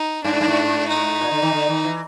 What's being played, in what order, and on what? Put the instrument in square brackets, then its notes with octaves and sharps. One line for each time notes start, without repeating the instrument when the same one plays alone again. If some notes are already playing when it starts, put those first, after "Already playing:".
Already playing: [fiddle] D#4
[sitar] G2 [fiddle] D4
[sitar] G#2
G2
G#2
[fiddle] D#4
[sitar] A#2
D3
D#3
D3
D#3
E3